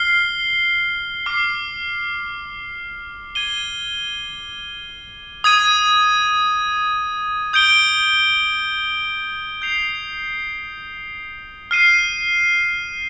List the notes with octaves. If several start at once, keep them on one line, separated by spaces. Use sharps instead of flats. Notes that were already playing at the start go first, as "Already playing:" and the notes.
Already playing: F6 C7 G7
D6 F6 C7
G#6 D#7 G7
D#6 G#6 D#7
D#6 G6 D7 G7
G6 C7 F7
F6 C7 D#7